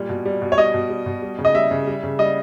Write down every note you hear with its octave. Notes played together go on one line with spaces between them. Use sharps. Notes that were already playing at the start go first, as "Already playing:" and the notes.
Already playing: A#2 G3
B2
G3
B2
C#5
G3 D#5
B2
G3
B2
G3
C#3
D#5
G3 E5
C#3
G3
C#3
G3 D#5